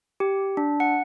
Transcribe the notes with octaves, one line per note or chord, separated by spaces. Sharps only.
G4
D4
F#5